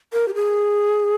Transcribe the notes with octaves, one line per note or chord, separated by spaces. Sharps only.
A#4
G4
G#4